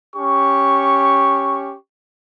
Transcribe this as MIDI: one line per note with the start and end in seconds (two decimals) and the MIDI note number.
0.16 1.76 61
0.16 1.76 67
0.16 1.76 85